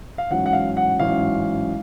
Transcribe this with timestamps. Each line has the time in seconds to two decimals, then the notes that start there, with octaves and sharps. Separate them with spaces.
0.18 F5
0.30 A1 G#2 F#3 C#4 F#5
0.46 F#5
0.53 F5
0.77 F#5
0.99 A1 G#2 F#3 C#4 F5